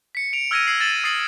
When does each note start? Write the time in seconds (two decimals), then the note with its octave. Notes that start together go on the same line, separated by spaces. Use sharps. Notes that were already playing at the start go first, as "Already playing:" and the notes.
0.15 B6 C#7
0.33 D7 F7
0.51 E6 F6 G#6 A#6 D7 D#7
0.67 E6 G#6 C7 F#7
0.80 A6 E7 F#7
1.04 D#6 A6 A#6 C7 F#7